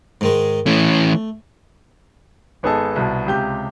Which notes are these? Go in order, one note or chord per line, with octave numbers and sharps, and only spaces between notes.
G#2 D#3 G#3
E3 A3 C#4
G#1 B3 D#4 G#4 A4 A5
C2 B2 A5
C#2 C3 G4 G6